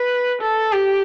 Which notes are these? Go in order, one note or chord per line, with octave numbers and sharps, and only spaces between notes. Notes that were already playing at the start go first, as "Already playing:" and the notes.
Already playing: B4
A4
G4